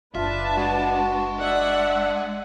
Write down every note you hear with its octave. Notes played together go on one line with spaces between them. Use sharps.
F#1 D4 F4 B4 E5 A5
G#3 F#4
D4 D5 E5 F#5